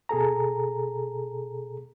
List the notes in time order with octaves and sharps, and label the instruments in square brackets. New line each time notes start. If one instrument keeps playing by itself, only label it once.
[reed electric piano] B2 G#4 A4 A#5